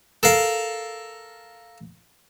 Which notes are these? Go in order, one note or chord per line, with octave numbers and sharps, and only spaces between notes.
A4 A#4 F5